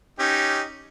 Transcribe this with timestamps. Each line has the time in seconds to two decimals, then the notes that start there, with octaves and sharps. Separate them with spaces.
0.19 C#4 D#4 G4